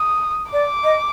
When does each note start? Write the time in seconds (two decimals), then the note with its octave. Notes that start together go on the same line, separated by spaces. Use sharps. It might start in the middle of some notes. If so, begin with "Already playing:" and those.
Already playing: D#6
0.53 D5 D6
0.84 D#5